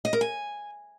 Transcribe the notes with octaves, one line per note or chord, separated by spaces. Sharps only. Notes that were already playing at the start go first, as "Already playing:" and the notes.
D#5
A#4
G#5